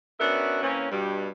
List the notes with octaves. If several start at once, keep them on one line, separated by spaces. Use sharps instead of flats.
B3 C#4 D4 F#4 A#4 E5
E3 A#3 C4 C#4
G2 B2 G3